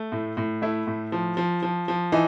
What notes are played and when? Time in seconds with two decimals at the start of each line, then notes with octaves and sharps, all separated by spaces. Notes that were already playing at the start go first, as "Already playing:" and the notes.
Already playing: A3
0.12 A2
0.37 A2
0.62 A3 E4
0.87 A2
1.12 F3
1.37 F3
1.63 F3
1.88 F3
2.12 E3 D#4